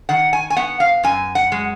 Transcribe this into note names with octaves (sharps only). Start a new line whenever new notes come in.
D#3 F#5
G#5
G#5
B3 F#5
F5
F#2 G#5
F#5
G#3